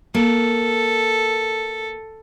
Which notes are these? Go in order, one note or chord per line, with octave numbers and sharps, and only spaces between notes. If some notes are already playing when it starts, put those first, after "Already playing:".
A#3 A4